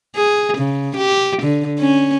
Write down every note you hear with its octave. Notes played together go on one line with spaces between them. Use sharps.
G#4
C#3
G4
D3
C#4